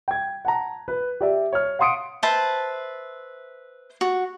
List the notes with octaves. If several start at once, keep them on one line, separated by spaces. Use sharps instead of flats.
G5 G#6
F#5 A5 A#5
B4
G4 D5 E5
C#5 F6
F5 F#5 C6 D#6 C#7 D7
B4 C5 E5 A5
F#4